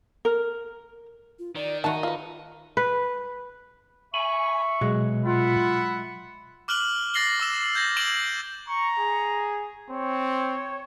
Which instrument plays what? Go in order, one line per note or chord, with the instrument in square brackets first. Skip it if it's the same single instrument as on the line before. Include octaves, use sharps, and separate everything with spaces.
[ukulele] A#4
[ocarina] F4
[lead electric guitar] D#3 [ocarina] D5
[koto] D#3 F#4 [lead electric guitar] D#4 [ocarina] E5 [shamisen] A5
[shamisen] F4 B4 [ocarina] A#4
[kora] B4
[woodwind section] E5 C#6 [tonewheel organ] G#5 B5
[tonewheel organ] B2 [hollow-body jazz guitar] F#3 G#3
[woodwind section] F4 [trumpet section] E5 F#5 B5
[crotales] D6 F6 F#6 F#7 G7
F6 A6 A#6 C7 F#7 G7
D6 E6 E7
G6 G#6 A#6
D6 A#6 D7 E7 F#7 G7
[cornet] A#5 [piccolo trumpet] C#6
[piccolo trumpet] G#4
[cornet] C4 [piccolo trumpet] C#5